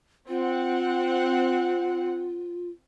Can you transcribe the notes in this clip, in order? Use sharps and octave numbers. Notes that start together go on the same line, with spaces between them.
C4 F4 F#5